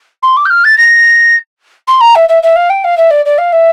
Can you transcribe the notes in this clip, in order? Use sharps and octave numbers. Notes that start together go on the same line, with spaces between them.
C6
D6
G6
F6
A6
A#6
C6
A#5
E5
E5
E5
F5
G5
F5
E5
D5
D5
F5
E5